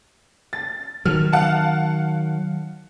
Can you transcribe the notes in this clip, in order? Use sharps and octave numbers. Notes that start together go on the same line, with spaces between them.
A6
D#3 F#3 F6
F5 F#5 A5